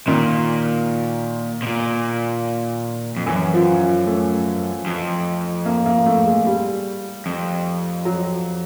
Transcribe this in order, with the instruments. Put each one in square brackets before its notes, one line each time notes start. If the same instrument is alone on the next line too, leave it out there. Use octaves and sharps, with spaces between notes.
[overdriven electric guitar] A#2 [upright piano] D#3
[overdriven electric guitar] B2
A#2
F2
[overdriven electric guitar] F#2 [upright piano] E3
[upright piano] F3
A3
[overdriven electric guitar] F2
[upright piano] A#3
A#3
A3
G#3
G3
[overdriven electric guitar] F2
[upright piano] F#3